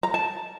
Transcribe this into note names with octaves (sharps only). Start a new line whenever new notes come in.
A#5
A5